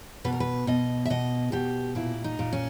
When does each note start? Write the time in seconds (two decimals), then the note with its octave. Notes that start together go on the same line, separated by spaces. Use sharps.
0.25 B2 B4
0.33 A#4
0.40 B4
0.67 B2 D#5
1.05 E5
1.10 B2 D#5
1.52 B2 G4
1.95 A#2 E4
2.24 D#4
2.39 A#2
2.53 C#4